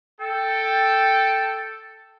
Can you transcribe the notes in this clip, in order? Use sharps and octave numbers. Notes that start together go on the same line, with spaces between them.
A4 G5